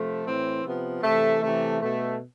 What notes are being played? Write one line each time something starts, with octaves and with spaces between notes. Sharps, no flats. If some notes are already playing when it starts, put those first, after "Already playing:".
Already playing: C3 F3 A3
A2 E3 C4
C3 F3 B3
C3 E3 A3
C3 E3 A3
B2 A3